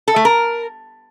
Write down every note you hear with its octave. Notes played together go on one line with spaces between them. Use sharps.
A4
A3
A#4